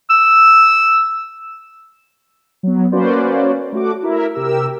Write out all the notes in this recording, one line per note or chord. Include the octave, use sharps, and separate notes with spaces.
E6
F#3 B3
A#3 C#4 F#4 B4 C5 D5
A3 F#4 D6
E4 A#4 E5
C3 G4 A#4 E6